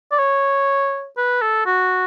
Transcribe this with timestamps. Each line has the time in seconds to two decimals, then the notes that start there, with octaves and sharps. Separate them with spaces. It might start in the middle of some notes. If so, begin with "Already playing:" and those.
0.12 D5
0.19 C#5
1.18 B4
1.42 A4
1.66 F#4